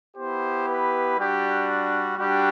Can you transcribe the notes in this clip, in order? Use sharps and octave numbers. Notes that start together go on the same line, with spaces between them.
B3 E4 G4 C5
B4
G3 D4 F#4 G4
G3 D4 F#4 G4